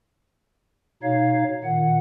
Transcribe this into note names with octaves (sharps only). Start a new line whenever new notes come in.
B2 D#4 C#5 F5
A#2 D#3 F#5